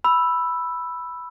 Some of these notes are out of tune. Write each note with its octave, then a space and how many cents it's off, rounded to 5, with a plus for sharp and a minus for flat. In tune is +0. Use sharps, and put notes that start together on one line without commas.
B5 +0 E6 +5